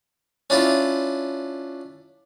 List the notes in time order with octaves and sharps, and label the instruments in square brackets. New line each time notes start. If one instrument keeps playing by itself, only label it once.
[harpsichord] C#4 D4 E4 F4